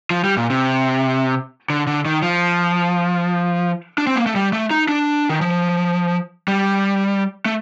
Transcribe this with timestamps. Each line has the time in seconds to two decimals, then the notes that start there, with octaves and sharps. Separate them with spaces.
0.11 F3
0.24 G3
0.37 A#2
0.50 C3
1.70 D3
1.87 D3
2.05 D#3
2.22 F3
3.98 D4
4.07 C4
4.16 A#3
4.26 A3
4.35 G3
4.53 A3
4.71 D#4
4.88 D4
5.29 D#3
5.41 F3
6.48 G3
7.45 A3